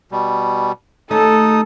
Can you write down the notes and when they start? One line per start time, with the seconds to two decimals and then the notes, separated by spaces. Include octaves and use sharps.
0.12 B2 G3
1.11 D#2 A3 C#4 D#4 A4 D#6